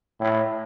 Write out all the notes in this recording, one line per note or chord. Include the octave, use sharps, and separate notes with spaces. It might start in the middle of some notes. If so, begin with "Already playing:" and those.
A2